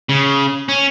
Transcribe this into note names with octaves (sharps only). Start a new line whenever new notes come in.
C#3
C#4